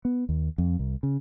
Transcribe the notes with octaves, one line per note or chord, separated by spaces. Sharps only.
B3
D#2
F2
C2
C#3